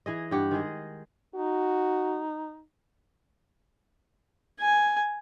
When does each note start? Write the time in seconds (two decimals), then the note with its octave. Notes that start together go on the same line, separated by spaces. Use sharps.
0.06 E3 G#4 D#5
0.31 G2 G4 F#5
0.51 D#3 G#3 G#4 D#5
1.35 D#4 F#4
4.61 G#5